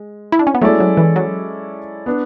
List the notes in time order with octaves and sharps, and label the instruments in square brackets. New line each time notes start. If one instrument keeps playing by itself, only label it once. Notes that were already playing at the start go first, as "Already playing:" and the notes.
Already playing: [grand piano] G#3
[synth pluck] E4
D4
C#4
B3
[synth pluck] F#3 A3 [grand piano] G#3 C#4 E4 A4 D5
[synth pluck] F#3
E3
F#3
[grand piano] B3 D4